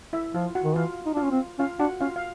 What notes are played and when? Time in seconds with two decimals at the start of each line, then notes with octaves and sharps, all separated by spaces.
0.13 E4 E5
0.34 F3 F4 F5
0.55 F#4 F#5
0.64 D#3
0.76 E3 F4 F5
1.06 D#4
1.14 D4 F4 F5
1.23 C#4
1.31 C4
1.59 C#4 F4 F5
1.79 D4 F#4 F#5
2.01 C#4 F4 F5
2.16 F5